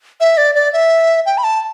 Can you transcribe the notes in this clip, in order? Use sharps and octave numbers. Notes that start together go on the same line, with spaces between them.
E5
D5
D5
E5
G5
B5
A5